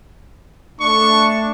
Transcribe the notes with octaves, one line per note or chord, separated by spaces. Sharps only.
A3 D4 C#6